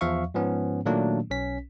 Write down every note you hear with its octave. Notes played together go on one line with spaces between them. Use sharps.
E2 F3 E5 F5 C#6
G#2 F3 B3 C#4
A#2 D#3 F#3 A3 A#3 D4
B1 C#4 B6